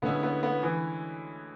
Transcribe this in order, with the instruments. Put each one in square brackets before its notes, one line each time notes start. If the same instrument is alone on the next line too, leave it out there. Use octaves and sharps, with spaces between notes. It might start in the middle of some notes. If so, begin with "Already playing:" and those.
[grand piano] D2 D3 G#3 C#4 E4 [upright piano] B3
[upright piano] B3
B3
E3